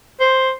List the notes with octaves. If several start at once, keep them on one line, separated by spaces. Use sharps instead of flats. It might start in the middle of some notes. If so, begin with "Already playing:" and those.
C5